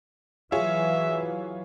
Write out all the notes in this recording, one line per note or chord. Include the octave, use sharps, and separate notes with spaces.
E3 F#3 F4 G#4 C#5 E5